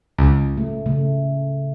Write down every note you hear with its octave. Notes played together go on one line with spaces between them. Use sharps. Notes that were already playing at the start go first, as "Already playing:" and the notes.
C#2
A3
C#3 A3